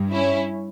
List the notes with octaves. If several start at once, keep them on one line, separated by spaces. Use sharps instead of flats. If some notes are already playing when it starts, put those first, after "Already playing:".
Already playing: G2
C#4 E4